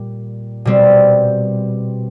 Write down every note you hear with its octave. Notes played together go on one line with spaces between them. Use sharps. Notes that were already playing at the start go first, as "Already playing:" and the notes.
Already playing: A#2 G3
B2 G3 C4